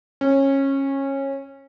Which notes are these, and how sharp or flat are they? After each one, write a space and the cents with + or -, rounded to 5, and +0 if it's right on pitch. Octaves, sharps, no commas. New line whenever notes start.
C#4 -20